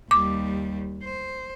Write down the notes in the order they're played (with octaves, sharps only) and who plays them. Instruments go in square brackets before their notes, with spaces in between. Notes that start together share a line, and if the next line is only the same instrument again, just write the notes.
[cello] D#2 G3 [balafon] D6
[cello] C5